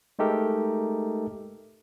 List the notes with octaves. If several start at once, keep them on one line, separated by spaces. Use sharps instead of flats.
G#3 A3 D#4 G4 A4 A#4